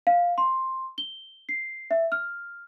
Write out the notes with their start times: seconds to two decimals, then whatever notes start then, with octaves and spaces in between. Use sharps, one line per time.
0.07 F5
0.38 C6
0.98 G7
1.49 C7
1.91 E5
2.12 F6